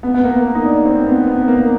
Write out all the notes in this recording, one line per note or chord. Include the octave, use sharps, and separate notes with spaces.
B3
B3
A#3
A#3
D#4
D4
C4
B3
B3
A#3